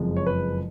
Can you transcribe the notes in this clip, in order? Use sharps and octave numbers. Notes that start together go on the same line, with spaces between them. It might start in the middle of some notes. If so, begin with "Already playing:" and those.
Already playing: F#1 F2 F3 G#3
C#5
B4